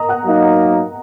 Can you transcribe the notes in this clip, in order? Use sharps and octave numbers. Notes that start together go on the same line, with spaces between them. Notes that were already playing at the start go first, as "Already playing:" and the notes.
Already playing: A#4 D#5 A#5 D#6
F#5 F#6
F#3 A#3 D#4